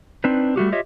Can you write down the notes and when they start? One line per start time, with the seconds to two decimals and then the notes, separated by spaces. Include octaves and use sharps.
0.24 C4 D4 D#4 B4
0.56 G3 A3 F#4 G4
0.72 F4 G4 C#5 D#5 E5